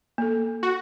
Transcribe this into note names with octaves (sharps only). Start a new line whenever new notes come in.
A#3 A4
F#4